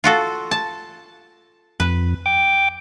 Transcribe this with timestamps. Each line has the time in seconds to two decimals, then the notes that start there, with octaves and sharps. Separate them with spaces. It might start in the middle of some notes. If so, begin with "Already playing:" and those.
0.04 F4 F#4 A4
0.51 A5
1.80 F2 B4
2.26 G5 D6